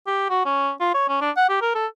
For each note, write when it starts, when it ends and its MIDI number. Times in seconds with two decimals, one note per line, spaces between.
0.07 0.27 67
0.30 0.45 66
0.45 0.71 61
0.80 0.91 65
0.94 1.04 73
1.09 1.17 61
1.21 1.31 62
1.37 1.48 78
1.49 1.60 67
1.62 1.74 70
1.75 1.87 69